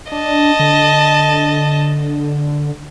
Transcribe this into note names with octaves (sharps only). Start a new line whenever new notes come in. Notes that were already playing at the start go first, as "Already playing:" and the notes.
D4 D#5 A5
D3